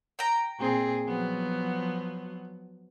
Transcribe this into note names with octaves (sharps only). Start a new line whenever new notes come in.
G5 A#5
A#2 C4 G#4
F3 F#3 B3